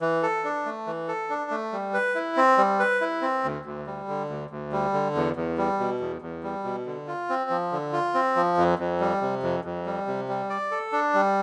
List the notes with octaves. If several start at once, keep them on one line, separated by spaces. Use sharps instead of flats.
E3
A4
D4
A3
E3
A4
D4
A3
G3
B4
E4
C4
G3
B4
E4
C4
D2
D2
G3
D3
D2
D2
G3
D3
E2
E2
G3
B2
E2
E2
G3
B2
D3
F4
C4
F3
D3
F4
C4
F3
F2
F2
G3
C3
F2
F2
G3
C3
G3
D5
A4
D4
G3